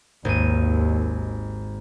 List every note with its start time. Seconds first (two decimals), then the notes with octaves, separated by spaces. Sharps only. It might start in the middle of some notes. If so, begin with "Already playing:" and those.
0.25 G#1 D#2 D#7